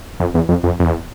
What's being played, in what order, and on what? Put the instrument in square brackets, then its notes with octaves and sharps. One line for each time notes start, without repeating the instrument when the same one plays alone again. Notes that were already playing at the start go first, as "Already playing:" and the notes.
[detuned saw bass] F2
E2
F2
F2
F2
E2